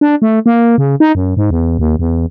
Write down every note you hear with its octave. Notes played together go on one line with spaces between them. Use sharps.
D4
A3
A#3
C#3
D#4
F#2
G#2
E2
D#2
E2